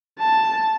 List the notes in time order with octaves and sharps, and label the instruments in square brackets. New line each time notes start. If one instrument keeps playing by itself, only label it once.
[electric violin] A5